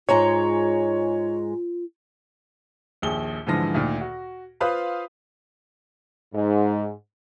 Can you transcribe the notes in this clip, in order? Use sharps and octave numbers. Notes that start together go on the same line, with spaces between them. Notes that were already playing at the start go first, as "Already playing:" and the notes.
G#2 G#3 F4 C#5 A#5
A#1 D#2 G#4 G7
G#2 D3 E3 F3 A#6
D2 A#2 D#3
F#4
F4 B4 C5 F5 B5 D#6
G#2